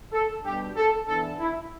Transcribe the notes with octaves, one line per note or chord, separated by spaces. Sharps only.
A4
B2 G3 D4 G4
A4
E3 B3 D4 A4
E4